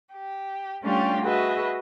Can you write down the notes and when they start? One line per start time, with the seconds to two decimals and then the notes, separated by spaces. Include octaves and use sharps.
0.14 G4
0.83 G3 A3 C#4 D4 F4 G4
1.22 F#4 G#4 B4 D#5 E5